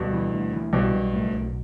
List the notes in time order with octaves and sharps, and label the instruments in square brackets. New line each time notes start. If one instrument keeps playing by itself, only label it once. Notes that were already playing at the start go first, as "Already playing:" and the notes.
Already playing: [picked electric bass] D2 [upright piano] G2 B2
[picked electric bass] E3
D2
E3
[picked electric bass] B1 [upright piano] G2 B2
[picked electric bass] B1
A2
B1